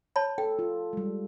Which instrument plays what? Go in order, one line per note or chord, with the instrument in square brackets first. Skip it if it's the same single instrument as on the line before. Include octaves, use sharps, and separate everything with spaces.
[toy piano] C#5 A5 B5
[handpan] A4 [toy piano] G5
[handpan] F4
G3 G#3